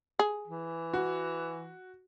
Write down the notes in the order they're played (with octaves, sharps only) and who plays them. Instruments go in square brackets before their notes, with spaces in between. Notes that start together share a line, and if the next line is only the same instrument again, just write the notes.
[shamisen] G#4
[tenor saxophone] E3
[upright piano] F#4